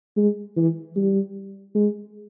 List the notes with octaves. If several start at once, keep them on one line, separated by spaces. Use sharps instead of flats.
G#3
E3
G3
G#3